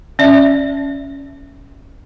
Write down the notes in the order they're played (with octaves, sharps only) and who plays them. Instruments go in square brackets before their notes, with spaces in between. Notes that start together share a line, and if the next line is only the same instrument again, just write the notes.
[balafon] C#4 D5 E5